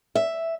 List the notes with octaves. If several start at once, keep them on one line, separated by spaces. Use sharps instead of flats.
E5